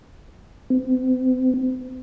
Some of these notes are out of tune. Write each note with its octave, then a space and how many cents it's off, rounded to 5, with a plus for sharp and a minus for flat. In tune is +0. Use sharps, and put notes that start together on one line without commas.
C4 -40